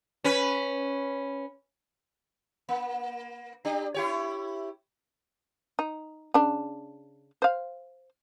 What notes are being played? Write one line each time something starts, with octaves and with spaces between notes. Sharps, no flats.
C#4 B4
A#3
D4 G4
E4 G4 C#5
D#4
C#3 D4
C5 F5